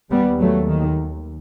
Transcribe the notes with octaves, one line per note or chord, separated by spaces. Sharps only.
D#2 G3 B3
F#3 A3
D#3